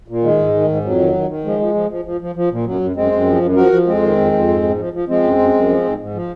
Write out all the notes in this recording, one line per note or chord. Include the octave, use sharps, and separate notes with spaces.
A#2
D#3 G#3
G#2
D#3
G#2
F2 F#3
D#3
D#3
D#3
F3 G#3
F3
F3
F3
F3
F3
F3
A#2
F#2 F#3
F#2
F#2 G#3 C4
F#2
F3
F#2
F3 F#4 A#4
F3
F2 G#3 C4
D#3
F2
F2
G#2
G#2
F3
F3
F3 G#3 C4
F#2
F#2
F#2
F3
G#2
G#2
F3